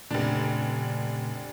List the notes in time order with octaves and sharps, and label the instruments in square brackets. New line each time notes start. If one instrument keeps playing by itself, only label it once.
[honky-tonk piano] F1 D4 [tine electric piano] A#2 C#3 A3